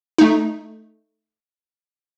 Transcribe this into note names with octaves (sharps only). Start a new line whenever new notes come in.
A3 D#4